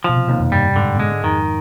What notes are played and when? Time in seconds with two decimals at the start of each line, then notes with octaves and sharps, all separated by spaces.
0.04 B2 F3
0.16 C3
0.28 D#2 C3
0.40 F2
0.52 G2 G3
0.76 G#2 D3
0.96 B2
0.99 G#2 G#3
1.12 G#2
1.24 F2 D#3